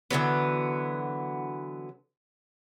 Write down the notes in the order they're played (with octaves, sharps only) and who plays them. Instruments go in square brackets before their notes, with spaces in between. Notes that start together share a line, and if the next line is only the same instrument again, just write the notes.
[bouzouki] D3 E3 F#3 B3